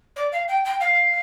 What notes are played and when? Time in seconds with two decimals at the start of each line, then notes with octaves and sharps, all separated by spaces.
0.16 D5
0.32 F5
0.48 G5
0.65 G5
0.80 F5